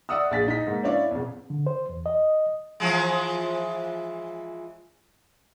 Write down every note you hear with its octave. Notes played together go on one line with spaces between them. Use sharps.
D5 E5 F#5 D#6 E6
A#1 G#4 A6 B6
D#4 B6
G#2 A#3
C#4 D4 E4 C#5 D5 F5
E1 F2
D3
C5
E2
D#5
E3 F3 G#3